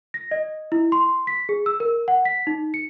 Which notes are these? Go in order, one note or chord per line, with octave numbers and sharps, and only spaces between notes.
A#6
D#5
E4
C6
B6
G#4
E6
A#4
F#5
B6
D#4
C#7